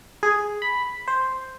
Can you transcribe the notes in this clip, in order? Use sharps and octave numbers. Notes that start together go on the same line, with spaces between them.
G#4
B5
C5